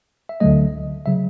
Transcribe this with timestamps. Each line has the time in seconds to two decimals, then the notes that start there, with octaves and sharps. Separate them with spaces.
0.29 E5
0.40 D2 D3 F#3 A3 D#5
1.06 C#3 F#3 E5